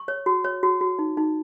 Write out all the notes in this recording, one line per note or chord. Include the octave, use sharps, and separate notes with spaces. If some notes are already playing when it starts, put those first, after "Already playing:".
Already playing: C#6
C#5
F#4
C#5
F#4
F#4
D#4
D#4